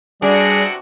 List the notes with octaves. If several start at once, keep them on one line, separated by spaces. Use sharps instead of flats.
E2 C3 G3 D4 F#4 G#4